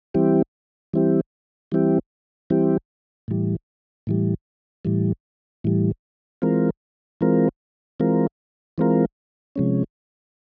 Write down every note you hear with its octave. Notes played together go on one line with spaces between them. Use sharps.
E3 G3 C4 E4 G4
E3 G3 C4 E4 G4
E3 G3 C4 E4 G4
E3 G3 C4 E4 G4
A2 E3 G3
A2 E3 G3
A2 E3 G3
A2 E3 G3
E3 G#3 C4 F4 A#4
E3 G#3 C4 F4 A#4
E3 G#3 C4 F4 A#4
E3 G#3 C4 F4 A#4
C3 F3 G#3 C#4